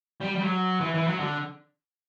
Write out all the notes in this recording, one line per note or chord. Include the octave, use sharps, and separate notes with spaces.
G3
G3
F#3
E3
E3
F#3
D3